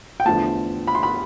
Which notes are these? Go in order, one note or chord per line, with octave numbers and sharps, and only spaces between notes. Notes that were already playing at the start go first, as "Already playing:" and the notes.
G5
E2 D3 F3 A3 A5
B5
C6
B5